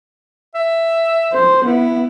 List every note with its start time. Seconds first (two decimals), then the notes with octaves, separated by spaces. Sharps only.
0.55 E5
1.33 C5
1.65 B3 E4